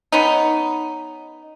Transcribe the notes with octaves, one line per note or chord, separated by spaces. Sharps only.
B3 C#4 D#4